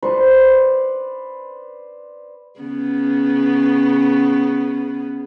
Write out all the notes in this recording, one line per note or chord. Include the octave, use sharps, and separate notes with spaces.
B4 C5 D5 C#6
C#3 B3